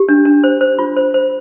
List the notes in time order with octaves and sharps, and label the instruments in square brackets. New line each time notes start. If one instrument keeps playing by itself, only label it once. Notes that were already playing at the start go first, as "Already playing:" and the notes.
Already playing: [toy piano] G4
D4
D4
C5
C5
F4
C5
C5